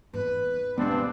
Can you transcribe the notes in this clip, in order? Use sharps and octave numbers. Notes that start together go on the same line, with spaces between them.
E2 G#2 B4
B1 E2 G2 G#3 B3 C4 D4